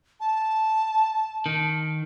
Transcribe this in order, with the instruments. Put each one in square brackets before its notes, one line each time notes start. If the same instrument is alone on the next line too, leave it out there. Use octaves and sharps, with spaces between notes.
[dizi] A5
[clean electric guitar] D#3